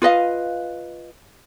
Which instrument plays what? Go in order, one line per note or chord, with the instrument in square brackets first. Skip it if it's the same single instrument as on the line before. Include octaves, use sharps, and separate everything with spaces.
[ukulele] F4 B4 D#5 F5